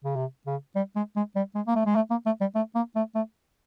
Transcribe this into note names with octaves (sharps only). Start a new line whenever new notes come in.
C#3
C3
C#3
G3
G#3
G#3
G3
G#3
A#3
A3
G#3
A3
A#3
A3
G3
A3
A#3
A3
A3